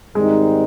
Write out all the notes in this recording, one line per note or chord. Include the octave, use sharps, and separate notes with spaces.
G#2 D#3 G3 G#3 C4 D#4